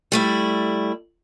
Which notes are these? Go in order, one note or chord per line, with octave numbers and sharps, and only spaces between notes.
G3 A3 E4